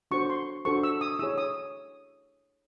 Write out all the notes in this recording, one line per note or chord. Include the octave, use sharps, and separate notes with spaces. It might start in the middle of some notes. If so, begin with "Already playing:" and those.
D4 F#4 A4 C5 C#6
C6
D4 F#4 A4 C5 C#6
E6
D#6
E4 G#4 C#5 E6
D#6